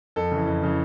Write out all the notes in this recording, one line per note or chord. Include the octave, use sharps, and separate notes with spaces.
F2 A4
C#3 E3
F2
C#3 E3